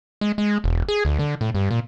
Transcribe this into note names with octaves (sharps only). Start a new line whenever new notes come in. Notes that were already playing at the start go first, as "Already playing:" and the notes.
G#3
G#3
E1
G#4
D2
D3
A2
G2
A#2